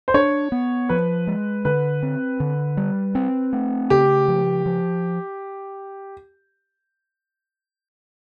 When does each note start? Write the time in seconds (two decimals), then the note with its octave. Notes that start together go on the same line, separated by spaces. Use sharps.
0.08 C5
0.14 D4 C#5
0.52 B3
0.89 F3 B4
1.27 G#3
1.65 D3 B4
2.03 C4
2.40 D3
2.77 G3
3.15 C4
3.53 A3
3.90 C#3 G4
4.28 F3
4.66 F3